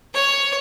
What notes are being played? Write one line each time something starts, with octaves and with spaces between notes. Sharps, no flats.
C#5